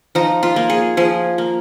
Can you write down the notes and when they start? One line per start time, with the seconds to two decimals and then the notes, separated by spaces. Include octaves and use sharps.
0.15 F3 D#4
0.43 F4
0.56 A#3
0.70 G#4
0.97 F3 G#4
1.38 A#3